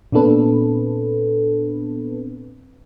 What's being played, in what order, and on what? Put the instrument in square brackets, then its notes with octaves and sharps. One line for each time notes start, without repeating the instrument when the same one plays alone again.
[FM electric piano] A#2 B3 C4 D4 A4 B4